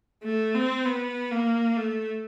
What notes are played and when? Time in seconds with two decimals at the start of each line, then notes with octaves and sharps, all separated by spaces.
0.24 A3
0.55 C4
0.85 B3
1.31 A#3
1.77 A3